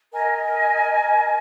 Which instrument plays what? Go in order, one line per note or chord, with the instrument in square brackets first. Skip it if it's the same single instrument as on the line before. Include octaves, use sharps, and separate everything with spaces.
[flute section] A#4 D#5 G#5